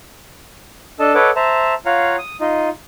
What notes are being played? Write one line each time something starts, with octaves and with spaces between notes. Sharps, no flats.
D4 A4 D#5 A5
A4 B4 C#5 D#5 F#5 D6
C5 E5 A5 A#5
F4 C#5 F5 F#5 A#5
D#6
D#4 F4 D#5